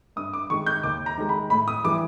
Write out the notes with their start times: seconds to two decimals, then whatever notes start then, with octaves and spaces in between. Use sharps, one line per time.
0.16 G2 D#6
0.33 D6
0.50 D#3 G#3 C#6
0.66 G6
0.83 D#2 D6
1.06 A#5
1.18 D#3 G#3
1.29 B5
1.50 A2 B5
1.68 D#6
1.84 E3 G3 D6